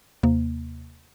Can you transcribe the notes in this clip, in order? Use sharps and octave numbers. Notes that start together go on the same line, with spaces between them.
D#2 C3 A#3